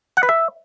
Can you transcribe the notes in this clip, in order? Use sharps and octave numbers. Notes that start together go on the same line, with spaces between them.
F#5
B4
E5